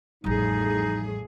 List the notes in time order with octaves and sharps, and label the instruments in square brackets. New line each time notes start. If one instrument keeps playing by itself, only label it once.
[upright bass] A1 G3 [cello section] F2 A2 G#4 [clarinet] D#4